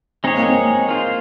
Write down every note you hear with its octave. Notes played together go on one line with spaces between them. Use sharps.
G#3 C4 D#4 G#4 C#5
A#3
C4
A#3 F4 C5